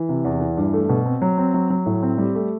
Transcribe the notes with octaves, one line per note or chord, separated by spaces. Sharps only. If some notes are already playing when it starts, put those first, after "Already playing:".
Already playing: E3
C3
E2
E3
G2
A3
B2
C4
F#3
C4
F#3
F#3
A2
C4
G3
A3